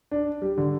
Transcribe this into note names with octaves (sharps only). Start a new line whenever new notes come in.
D4
G3
D3